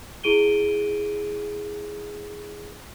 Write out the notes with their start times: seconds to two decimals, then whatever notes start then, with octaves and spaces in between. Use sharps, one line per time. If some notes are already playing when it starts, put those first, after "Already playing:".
0.24 E4 G#4 D7 D#7 G7